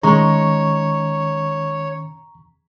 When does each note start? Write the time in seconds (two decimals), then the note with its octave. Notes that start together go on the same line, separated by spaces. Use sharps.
0.03 D#3 G#3 C#4 C#5 A#5 C#6